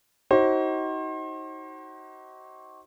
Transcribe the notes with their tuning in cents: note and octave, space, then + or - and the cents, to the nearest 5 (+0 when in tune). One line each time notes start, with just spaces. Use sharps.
D#4 +30 F#4 +35 C5 +35